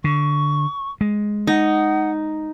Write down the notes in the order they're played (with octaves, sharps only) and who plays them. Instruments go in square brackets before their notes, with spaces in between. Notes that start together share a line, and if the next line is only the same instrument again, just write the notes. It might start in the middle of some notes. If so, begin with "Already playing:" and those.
[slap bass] D3 [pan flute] C#6
[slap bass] G#3
[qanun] D#4 [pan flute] F#5